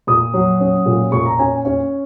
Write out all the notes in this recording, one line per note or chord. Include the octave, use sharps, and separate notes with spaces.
A#2 D#6
F#3
C#4
A#2
A#2 C#6
A#5
C#4 G#5
C#4 C#5